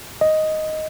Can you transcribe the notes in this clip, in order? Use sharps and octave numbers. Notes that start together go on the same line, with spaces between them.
D#5